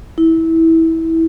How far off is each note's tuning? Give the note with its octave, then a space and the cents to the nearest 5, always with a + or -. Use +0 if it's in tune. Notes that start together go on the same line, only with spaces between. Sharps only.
E4 -20